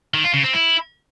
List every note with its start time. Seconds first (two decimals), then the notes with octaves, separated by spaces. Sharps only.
0.14 D#3
0.24 F4
0.34 C#3
0.44 C4
0.53 E4